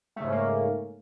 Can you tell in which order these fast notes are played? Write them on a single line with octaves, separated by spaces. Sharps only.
A3 C#3 G#2 C#4 A#3